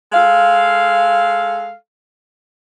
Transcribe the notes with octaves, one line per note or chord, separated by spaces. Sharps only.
G#3 A4 F5